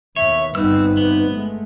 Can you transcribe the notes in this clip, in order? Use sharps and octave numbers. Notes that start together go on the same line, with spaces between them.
D#2 B2 C#5 E5
G1 G2 B3 C4 D#4 B4 E6
C3 B3
G#3 A3